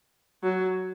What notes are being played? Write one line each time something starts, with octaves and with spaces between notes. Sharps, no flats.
F#3